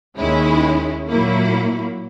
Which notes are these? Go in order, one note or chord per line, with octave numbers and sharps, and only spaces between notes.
D#2 D#3 G#3 C#4 E4
A#2 F#3 A#3 E4